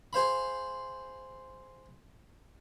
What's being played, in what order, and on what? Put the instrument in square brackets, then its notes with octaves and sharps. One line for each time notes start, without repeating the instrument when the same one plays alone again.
[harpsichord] G#4 C5 F5 B5